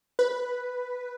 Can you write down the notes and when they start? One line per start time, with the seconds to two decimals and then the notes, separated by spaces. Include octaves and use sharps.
0.19 B4